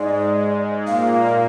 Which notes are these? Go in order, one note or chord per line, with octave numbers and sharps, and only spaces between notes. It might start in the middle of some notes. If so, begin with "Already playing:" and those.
Already playing: G#2 G#3 D5
A#2 A#3 F5